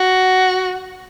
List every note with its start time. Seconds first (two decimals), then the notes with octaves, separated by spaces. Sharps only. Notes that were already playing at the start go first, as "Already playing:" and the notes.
Already playing: F#4